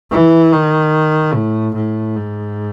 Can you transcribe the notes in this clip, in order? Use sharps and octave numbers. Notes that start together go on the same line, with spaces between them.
E3
D#3
A2
A2
G#2